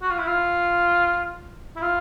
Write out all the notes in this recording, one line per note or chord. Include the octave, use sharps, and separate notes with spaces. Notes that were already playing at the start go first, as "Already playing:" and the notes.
F#4
F4
E4
F4
E4
F4